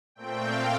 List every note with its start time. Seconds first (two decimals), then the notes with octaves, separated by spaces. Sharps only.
0.15 A#2 A3 C4 G5
0.44 F5